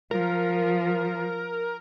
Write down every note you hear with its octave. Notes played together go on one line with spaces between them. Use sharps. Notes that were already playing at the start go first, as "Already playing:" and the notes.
F3 A#4